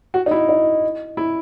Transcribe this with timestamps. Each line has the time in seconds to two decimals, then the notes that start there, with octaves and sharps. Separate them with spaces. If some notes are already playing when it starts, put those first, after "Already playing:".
0.14 F#4
0.26 D#4
0.31 E4
0.49 D#4
1.17 E4